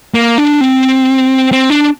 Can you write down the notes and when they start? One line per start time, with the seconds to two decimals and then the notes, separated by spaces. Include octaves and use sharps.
0.14 A#3
0.38 D4
0.61 C4
1.52 C4
1.70 D4